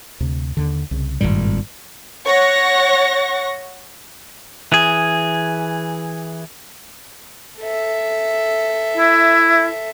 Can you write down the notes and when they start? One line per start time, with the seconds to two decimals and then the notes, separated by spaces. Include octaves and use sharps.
0.20 D2 C3
0.57 D#2 D3
0.91 C2 C#3
1.21 G#1 G2 A#2 G3
2.26 C#5 F#5 C#6 A#6
4.72 E3 G#4
7.60 A4 E5
8.97 E4